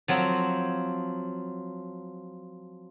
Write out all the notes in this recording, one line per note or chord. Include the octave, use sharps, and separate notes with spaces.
F3 F#3 C4